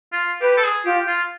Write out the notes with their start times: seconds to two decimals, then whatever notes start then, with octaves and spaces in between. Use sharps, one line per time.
0.12 F4
0.41 G4 B4
0.57 A4
0.64 G#4
0.85 F4 G4
1.08 F4